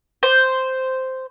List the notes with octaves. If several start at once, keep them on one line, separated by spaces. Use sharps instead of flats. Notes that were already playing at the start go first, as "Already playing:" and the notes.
C5